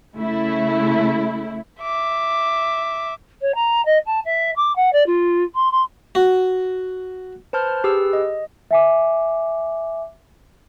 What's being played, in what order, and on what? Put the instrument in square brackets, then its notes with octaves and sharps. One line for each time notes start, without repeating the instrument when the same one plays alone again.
[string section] C#3 A3 E4
[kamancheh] E5 D6
[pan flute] C#5
A#5
D#5
A5
E5
D6
F#5
D5
F4
C6
C6
[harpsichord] F#4
[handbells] B4 C5 A5 F6 G6
G4 G#4 B4 E6
D#5
[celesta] E5 G#5 D6